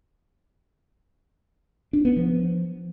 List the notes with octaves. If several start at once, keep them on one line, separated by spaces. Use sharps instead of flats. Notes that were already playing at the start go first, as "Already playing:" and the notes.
D4
B3
F3